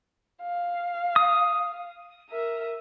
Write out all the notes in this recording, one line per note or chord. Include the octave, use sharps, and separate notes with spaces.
F5
D#6
A#4 E5